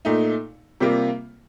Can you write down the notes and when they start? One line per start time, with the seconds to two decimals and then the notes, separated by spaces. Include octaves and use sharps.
0.05 A#2 A3 D#4
0.80 C3 G3 A#3 F4